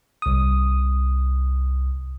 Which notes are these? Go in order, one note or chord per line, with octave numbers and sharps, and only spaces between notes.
C2 D#6